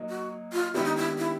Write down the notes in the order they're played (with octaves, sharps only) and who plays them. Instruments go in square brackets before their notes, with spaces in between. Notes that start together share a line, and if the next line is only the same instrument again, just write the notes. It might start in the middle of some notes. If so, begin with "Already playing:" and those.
Already playing: [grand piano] F#3 A#3 D#4
[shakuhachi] F#4
F4
[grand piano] D#3 G#3 B3 D4 G4 [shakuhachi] E4
[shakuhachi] D#4
E4
E4